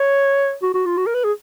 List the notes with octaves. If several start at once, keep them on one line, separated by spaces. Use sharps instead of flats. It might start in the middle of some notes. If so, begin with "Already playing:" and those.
Already playing: C#5
F#4
F#4
F4
F#4
A#4
B4
G#4